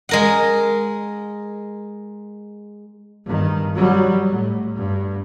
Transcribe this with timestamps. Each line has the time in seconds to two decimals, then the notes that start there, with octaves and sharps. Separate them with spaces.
0.09 G#3 A#4 F#5
3.26 G2 D#3
3.75 F#3 G3
4.30 A2
4.75 G2